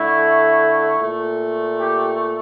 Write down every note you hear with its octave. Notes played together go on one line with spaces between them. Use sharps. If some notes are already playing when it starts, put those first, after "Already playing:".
Already playing: D3 A3 E4
A#2 A3
G4